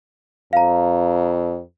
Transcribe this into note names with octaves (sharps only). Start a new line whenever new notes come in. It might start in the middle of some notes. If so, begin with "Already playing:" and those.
F2 F5 A#5